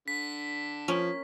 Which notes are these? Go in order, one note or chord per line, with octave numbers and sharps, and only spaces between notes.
D3 B6
F3 A#3 C#4